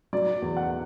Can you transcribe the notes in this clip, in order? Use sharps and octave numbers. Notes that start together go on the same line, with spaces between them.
F#3 D5
E2
F#5